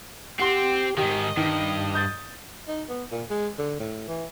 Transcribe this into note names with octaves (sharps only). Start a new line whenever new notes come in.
C4 G4 F#5 C6
G#2 D#3 G4 D#5
G2 D#3
D#6 G6 A6
D#4
B3
A#2
G#3
D3
A2
E3